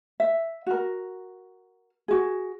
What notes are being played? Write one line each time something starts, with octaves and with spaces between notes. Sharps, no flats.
E5
F#4 A#4
F#4 G#4